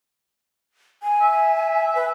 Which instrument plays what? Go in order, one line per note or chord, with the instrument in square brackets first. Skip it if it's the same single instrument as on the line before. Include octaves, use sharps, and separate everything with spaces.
[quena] G#5
[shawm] E5
[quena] B4